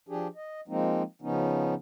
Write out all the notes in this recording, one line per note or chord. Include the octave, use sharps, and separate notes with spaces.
F3 D4 G4 G#4
D#5
F3 G#3 A#3 C4 D#4
C#3 F3 B3 C#4 D#4